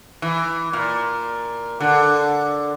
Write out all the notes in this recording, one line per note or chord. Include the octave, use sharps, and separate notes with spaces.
E3
A#2
D3